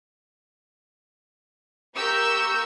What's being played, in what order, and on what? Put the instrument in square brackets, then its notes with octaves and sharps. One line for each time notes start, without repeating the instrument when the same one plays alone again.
[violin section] A#3 G4 A#4 C#6 E6 G6